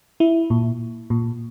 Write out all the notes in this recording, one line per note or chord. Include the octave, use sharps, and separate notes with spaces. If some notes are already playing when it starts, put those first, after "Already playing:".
E4
A#2
A#2